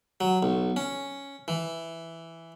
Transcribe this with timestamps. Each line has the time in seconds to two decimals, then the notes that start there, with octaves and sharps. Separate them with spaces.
0.20 F#3
0.43 B1
0.76 C#4
1.48 E3